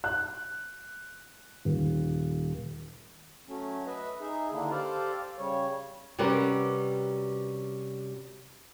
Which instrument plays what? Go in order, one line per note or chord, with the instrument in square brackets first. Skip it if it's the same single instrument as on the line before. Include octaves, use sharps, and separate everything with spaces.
[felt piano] F#6
D#1
[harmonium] F#3 A3 C#4
B4 D#5 E5
D#4 G#4 E5
D3 D#3 A#3 D4 E4
G4 A4 C5 D5 F5
C#3 G3 C#5
[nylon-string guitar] C3 G3 C#4 F#4 A#4 B4